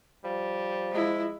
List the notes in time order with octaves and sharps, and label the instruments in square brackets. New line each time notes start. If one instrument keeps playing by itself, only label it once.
[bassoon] F3 [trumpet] G3
[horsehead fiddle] G#3 E4